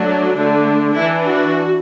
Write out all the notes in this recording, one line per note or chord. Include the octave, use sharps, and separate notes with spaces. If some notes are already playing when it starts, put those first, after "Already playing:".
Already playing: F#3 A3 D4
D3 A3 D4
E3 D4 E4
F#4